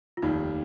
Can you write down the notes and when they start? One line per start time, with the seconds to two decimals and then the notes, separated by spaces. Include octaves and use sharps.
0.17 F4
0.22 F1 D#2 D#3 G3 D#4